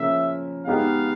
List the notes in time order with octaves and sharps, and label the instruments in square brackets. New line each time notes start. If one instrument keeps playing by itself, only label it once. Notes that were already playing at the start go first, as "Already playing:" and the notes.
Already playing: [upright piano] C#3 F3 A#3 [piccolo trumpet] E5
[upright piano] G#3 B3 D#4 G4 [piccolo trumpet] F5